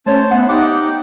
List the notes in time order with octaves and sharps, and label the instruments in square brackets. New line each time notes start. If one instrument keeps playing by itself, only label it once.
[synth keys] A3 C#5 [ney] C#4 [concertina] C5 A5
[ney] B3 [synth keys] E5 F#5
[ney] D#4 [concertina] G4 F#5 [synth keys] D6